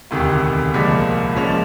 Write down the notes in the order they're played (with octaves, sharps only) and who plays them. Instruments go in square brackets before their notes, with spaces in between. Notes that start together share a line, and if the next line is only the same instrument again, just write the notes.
[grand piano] E1 D2 C3 D#3
C2 A#2 F3 G#3
A#2 F3 G#3 C#4